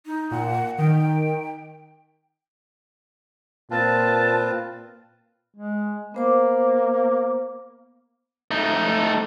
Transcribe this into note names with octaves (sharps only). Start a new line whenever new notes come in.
D#4
A#2 F#5
D#3 G5
A#2 C4 F4 B4 A5
G#3
A#3 B3 C5 D6
A3 D#4